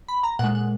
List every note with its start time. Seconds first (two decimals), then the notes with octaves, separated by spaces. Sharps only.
0.08 B5
0.23 A#5
0.39 A#2 G#3 F#5
0.55 F#5